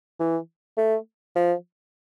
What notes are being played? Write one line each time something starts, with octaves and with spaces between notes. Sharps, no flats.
E3
A3
F3